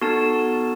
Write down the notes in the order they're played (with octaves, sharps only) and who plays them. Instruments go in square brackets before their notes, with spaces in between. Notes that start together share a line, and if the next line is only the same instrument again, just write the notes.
[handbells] B3 D#4 F#4 A4 A5